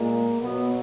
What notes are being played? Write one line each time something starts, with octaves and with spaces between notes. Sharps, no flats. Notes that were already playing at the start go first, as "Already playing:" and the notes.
Already playing: A#2 G#3 A#3
B2 F#3 B3